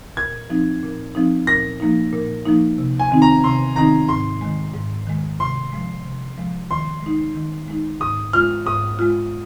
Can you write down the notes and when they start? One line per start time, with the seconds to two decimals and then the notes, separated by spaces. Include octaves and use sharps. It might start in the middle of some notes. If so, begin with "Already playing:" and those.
0.17 A#2 G#6
0.50 F3 C4 D#4
0.83 A#2
1.15 F3 C4 D#4
1.47 A#2 A#6
1.80 F3 A#3 D#4
2.13 A#2
2.45 F3 A#3 D#4
2.78 C3
2.99 G#5
3.11 D#3 C4 D#4
3.22 A#5
3.44 C3 C6
3.76 D#3 C4 D#4 A#5
4.08 G#2 C6
4.41 D#3 G#3
4.74 G#2
5.07 D#3 G#3
5.39 C3 C6
5.72 F3 G#3
6.05 C3
6.38 F3 G#3
6.70 D#3 C6
7.03 G#3 D#4
7.35 D#3
7.68 G#3 D#4
8.01 G#2 D#6
8.33 G#3 F4 F6
8.66 G#2 D#6
8.99 G#3 F4